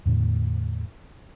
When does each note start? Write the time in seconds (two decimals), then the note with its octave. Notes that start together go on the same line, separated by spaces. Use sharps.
0.05 E2 A2 D3 A3